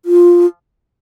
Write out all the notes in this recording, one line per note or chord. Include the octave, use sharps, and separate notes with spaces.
F4